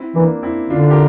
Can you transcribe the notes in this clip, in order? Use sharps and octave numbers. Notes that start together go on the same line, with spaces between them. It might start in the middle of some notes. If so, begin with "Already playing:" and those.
Already playing: C4 E4
E3 A#3 D4
C4 E4
D3 D4 F4
G4 A#4